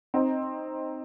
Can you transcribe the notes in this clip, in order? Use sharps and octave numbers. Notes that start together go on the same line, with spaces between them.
C4 D#4